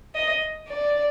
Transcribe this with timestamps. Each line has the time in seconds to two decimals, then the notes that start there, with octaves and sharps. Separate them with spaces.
0.15 D#5
0.69 D5